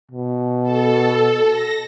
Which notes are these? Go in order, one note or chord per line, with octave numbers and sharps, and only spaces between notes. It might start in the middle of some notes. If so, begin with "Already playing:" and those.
B2
A4
A#6